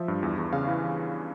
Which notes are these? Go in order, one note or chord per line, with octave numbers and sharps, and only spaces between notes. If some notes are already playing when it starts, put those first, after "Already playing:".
Already playing: F3 E5
G2
E2
E2
C#3 F5
E3